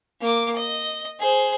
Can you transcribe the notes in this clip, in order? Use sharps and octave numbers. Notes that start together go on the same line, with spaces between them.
A#3 D6
D#5
G#4 C5